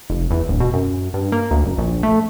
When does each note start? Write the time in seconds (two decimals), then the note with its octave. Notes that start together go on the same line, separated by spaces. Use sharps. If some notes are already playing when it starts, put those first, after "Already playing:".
0.10 F1
0.31 E2
0.49 D1
0.60 B2
0.73 F#2
1.14 G2
1.32 A#3
1.51 D2
1.65 F#1
1.78 A#1
2.03 A3